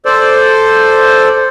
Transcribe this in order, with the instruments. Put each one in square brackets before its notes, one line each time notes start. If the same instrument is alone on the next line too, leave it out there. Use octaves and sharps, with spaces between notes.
[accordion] A4 C5 D5